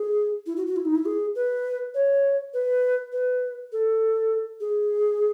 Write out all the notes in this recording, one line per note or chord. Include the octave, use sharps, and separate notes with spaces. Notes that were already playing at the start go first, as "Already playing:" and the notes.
Already playing: G#4
E4
F#4
F#4
E4
D#4
E4
G#4
B4
C#5
B4
B4
A4
G#4